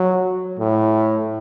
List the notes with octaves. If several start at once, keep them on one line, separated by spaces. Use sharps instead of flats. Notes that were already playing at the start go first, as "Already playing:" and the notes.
Already playing: F#3
A2